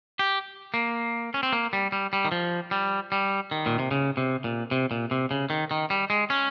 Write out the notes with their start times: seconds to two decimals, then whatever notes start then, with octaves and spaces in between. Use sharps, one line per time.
0.19 G4
0.74 A#3
1.34 C#4
1.43 C4
1.53 A#3
1.73 G3
1.92 G3
2.13 G3
2.25 D#3
2.32 F3
2.71 G3
3.12 G3
3.51 D#3
3.66 A#2
3.79 C3
3.91 C#3
4.17 C3
4.44 A#2
4.71 C3
4.91 A#2
5.11 C3
5.31 C#3
5.50 D#3
5.71 D#3
5.90 G3
6.10 G#3
6.30 C#4